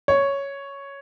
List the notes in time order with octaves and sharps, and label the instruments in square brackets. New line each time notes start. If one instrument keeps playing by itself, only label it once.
[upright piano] C#5